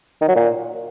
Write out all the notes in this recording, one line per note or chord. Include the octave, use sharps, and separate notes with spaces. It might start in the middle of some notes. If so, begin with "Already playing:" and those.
D#3
F#3
A#2